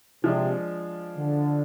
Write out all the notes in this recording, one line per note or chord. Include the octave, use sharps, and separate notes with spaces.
C3 F3 G#3 D4
D3